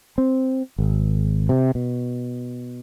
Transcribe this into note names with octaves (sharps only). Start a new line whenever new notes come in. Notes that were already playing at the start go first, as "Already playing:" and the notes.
C4
G#1
C3
B2